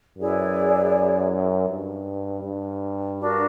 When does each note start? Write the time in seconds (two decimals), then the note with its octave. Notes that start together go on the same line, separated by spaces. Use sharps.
0.18 F#2 E4 G#4 B4 D5
1.69 G2
2.44 G2
3.19 D4 F#4 A#4